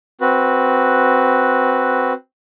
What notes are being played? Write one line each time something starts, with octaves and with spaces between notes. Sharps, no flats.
C4 F#4 B4